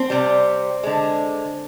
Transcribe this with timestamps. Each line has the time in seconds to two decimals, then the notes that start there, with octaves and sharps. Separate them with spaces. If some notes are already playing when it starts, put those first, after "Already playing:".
Already playing: C4
0.10 C3 G3
0.83 D3 G#3